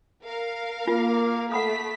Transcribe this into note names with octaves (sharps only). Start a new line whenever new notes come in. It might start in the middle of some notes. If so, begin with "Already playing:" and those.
A#4 F5
A#3 F4
A3 F#5 B5 D#6 B6